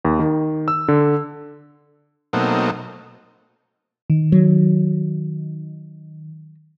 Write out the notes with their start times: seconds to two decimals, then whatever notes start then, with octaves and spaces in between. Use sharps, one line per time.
0.05 D#2
0.19 D#3
0.68 E6
0.88 D3
2.33 B2 F#3 A3 A#3 C4 D#4
4.10 D#3
4.32 F#3